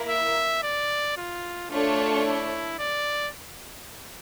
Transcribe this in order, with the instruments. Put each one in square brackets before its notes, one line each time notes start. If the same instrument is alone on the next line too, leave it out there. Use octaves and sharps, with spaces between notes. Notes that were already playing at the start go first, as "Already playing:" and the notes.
Already playing: [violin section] A#3 E4 A#4
[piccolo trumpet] E5
D5
F4
[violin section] A3 D4 A4 C#5 [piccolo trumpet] F4
[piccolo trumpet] E4
D5